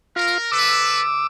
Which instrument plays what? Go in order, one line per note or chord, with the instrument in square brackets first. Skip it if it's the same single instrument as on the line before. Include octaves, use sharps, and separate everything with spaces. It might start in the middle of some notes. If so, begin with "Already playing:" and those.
[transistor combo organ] F4 [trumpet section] A#4
[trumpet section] A4 B4 [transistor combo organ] D6 E6